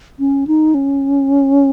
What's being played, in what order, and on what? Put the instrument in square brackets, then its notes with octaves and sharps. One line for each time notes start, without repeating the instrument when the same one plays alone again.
[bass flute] C#4
D#4
C#4